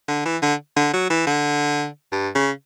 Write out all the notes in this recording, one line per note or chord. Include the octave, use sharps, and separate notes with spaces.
D3
E3
D3
D3
F#3
E3
D3
G2
C#3